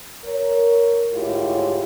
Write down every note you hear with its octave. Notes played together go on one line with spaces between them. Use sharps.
A#4 C#5
D2 G#2 E4 F4 G4 C#5